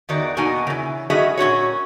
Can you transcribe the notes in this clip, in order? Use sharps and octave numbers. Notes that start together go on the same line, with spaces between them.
E2 D#3 F#4 D5
E2 B2 A#3 D#4 F#4 G#5
C#3 E3
G3 C#4 F#4 G#4 D#5 E5
A#2 C#4 F#4 C#5